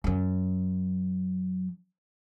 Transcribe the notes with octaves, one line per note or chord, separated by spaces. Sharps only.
F#2 F#3